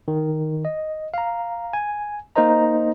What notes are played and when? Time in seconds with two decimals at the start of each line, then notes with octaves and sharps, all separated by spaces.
0.08 D#3
0.65 D#5
1.14 F5 A#5
1.73 G#5
2.36 A#3 D#4 A#4 C5 D#5 A#5